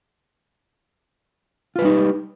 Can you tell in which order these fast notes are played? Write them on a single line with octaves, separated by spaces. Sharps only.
F4 B4 G3 D#4 G4